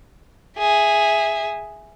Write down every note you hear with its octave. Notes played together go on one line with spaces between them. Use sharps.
G#4 E5